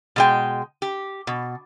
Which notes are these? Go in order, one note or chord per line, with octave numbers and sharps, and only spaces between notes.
B2 G#3 G5
G4
B2